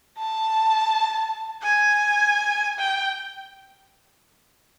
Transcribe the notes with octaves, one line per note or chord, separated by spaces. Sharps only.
A5
G#5
G5